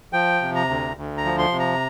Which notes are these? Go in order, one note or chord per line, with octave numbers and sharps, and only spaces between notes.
F3 G5
C3
A#5
D2
D2
A#5
F3
C6
C3
A#5